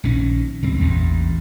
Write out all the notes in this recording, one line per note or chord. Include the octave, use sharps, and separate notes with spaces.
A#1 D#3 C#4
C#2 G2 C4
A1 E2 G2 A#2